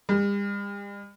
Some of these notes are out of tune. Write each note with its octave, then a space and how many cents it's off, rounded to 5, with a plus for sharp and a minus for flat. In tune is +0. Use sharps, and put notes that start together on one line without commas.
G3 +45